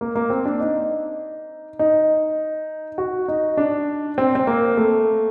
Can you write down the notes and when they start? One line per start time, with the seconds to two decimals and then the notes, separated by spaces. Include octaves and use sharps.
0.01 A#3
0.15 A#3
0.30 C4
0.45 D4
0.60 D#4
1.79 D#4
2.98 F#4
3.28 D#4
3.57 D4
4.18 C4
4.35 C4
4.47 A#3
4.77 A3